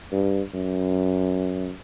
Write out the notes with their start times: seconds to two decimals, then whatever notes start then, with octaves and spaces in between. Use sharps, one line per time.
0.12 G2
0.54 F#2